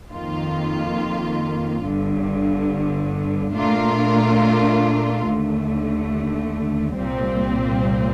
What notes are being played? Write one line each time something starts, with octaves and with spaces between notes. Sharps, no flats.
F2 D#3 A#3 F4
G1 G2 D3
A#2 A3 D4 F4 A#4
D#2 D3 A3
C2 A#2 G3 C4